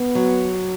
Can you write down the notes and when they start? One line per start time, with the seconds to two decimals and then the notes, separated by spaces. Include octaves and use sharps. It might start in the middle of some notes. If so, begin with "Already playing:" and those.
Already playing: B3
0.15 F#3